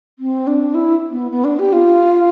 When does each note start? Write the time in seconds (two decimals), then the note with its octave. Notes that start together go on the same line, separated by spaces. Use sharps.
0.19 C4
0.47 D4
0.74 E4
1.11 B3
1.31 B3
1.44 D4
1.59 G4
1.73 F4